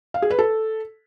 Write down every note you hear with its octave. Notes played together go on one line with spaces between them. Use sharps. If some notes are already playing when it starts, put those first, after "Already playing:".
F5
G#4
B4
A4